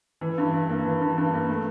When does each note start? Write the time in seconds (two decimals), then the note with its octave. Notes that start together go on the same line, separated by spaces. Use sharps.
0.21 E3
0.38 G2
0.53 G2
0.69 A#3
0.85 E3
1.01 G2
1.18 G2
1.34 A#3
1.49 A3